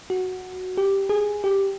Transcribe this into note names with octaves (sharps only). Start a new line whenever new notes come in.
F#4
G4
G#4
G4